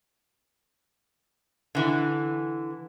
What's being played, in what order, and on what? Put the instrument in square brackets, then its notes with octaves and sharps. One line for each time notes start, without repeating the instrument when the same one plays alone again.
[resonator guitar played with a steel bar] D3 E3